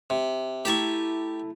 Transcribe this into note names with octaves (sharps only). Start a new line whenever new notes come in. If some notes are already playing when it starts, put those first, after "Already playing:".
C3
A3 E4 G4 A5 A#5 C#6